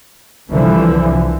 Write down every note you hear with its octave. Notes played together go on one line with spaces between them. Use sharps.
C2 D3 E3 F3